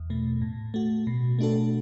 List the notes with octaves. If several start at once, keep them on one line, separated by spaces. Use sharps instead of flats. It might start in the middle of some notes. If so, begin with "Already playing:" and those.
Already playing: E2
B2 A3
A2
A3 F#4
B2
A3 D4 F#4 A4